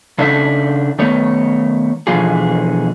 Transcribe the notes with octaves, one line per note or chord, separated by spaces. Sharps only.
C#3 D4 D#4 A4 E5
D#3 A3 B3 C#5
B2 D3 E3 F3 F4 G#4